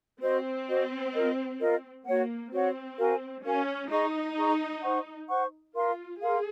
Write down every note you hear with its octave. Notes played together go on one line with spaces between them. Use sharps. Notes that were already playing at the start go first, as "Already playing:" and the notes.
C4 F#4 C5 D#5
F#4 C5 D#5
F4 A#4 D#5
F4 A#4 D#5
A#3 F#4 C#5 F#5
C4 F#4 C#5 F#5
F#4 A#4 F5 G#5
C#4 F#4 A#4 F5 G#5
D#4 G#4 D#5 A#5 C#6
G#4 D#5 A#5 C#6
C5 F#5 C#6
C5 F#5 C#6
F4 A#4 F5 C6
G#4 A#4 F5 C6